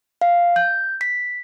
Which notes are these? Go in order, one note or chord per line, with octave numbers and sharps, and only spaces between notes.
F5
G6
B6